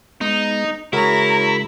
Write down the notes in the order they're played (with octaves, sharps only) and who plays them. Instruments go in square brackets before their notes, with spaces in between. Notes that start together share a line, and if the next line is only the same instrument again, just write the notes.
[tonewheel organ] G#3 B3 [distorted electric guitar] D#4
[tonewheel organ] C#3 G#3 [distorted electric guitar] E4 [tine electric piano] F#4 G#4 A#4 [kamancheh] C#5 A#5